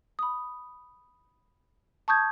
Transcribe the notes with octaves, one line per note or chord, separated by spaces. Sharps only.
B5 D#6
A5 C#6 D#6 G6 G#6